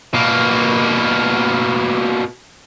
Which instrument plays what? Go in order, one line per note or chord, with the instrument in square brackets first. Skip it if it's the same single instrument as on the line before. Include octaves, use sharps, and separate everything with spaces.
[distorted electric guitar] B2 A#3